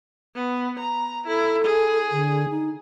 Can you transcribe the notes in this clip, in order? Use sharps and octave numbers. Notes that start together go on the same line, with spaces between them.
B3
A#5
E4 A4
G#4
D3
D#4